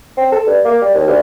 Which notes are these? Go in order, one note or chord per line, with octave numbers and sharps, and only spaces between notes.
C4
A4
G2
A#3
G3
D#2
D2